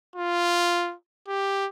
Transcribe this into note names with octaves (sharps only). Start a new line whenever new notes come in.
F4
G4